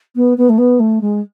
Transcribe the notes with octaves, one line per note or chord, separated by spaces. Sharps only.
B3
B3
A3
B3
A3
G#3